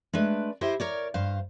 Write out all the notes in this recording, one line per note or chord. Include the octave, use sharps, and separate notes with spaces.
G#3 A3 D4 B4
E4 G4 C5 D#5 E5
A#4 C#5 D5
G2 C5 F5